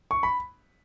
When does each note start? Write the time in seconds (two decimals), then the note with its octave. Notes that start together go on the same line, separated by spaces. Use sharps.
0.11 C#6
0.23 B5